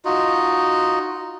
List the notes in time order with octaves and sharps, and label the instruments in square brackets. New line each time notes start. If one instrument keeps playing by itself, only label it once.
[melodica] D#4 F4 F#4 D#5